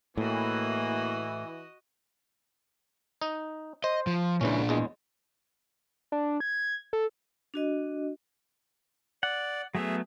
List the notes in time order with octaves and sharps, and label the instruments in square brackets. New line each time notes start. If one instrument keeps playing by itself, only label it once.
[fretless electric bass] A2 [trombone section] E3 [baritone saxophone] A#3 [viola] F#4 D#5
[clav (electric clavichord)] D#4
[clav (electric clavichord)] C5 [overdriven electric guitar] D#5
[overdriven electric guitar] F3
[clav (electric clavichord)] C#2 E3 C#4 [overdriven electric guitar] A#2 D4
[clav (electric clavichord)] E2 G#3
[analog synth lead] D4
G#6
A4
[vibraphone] D4 F#4 D#5
[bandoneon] D5 [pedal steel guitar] F#5
[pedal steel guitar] F#3 A3 B3 [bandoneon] G#4 E5